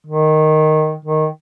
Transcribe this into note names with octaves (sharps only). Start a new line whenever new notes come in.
D#3
D#3